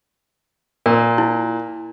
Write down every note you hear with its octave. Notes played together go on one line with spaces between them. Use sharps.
A#2 A#4
E4